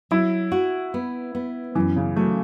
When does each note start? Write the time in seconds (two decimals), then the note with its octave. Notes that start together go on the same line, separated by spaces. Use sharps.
0.11 F#3 E4
0.52 F#4
0.94 B3
1.35 B3
1.75 F#2 E3
1.96 C#3
2.16 F#3 A3